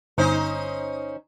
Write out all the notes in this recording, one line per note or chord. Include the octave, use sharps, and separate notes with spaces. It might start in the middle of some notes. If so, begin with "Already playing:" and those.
G1 C#4 D#4 C5